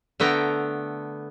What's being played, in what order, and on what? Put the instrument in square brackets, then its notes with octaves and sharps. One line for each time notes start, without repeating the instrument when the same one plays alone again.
[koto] D3 A3 B3 G5 A#5